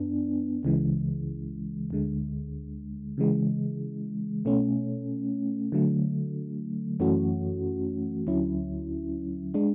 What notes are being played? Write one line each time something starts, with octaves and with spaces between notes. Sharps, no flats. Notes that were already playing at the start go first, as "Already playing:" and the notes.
Already playing: F#2 B3 D4
C#2 C#3 E3 G#3
D2 D3 G#3
C#3 E3 G#3
B2 A3 C#4
D3 F#3 A3
F#2 E3 A3 C#4 F#4
D2 D3 F#3 C#4 E4
G#3 D4